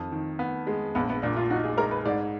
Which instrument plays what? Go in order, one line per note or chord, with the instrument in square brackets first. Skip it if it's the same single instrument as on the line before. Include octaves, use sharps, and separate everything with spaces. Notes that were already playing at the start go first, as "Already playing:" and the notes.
Already playing: [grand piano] F2 D#3
D#3
B3
G#3
[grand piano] A#1 [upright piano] B3
[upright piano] B3
[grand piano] A#2 [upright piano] D4
[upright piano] F4
[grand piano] D#4 [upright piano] F#4
[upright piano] G#4
[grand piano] G#3 [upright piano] A#4
[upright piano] B4
[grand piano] G#2 [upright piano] D5